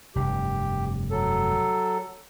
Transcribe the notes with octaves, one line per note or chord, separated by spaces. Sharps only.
F1 G2 G4
F#3 A4